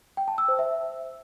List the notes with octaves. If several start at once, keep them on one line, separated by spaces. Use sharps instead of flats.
G5
A5
E6
C5
E5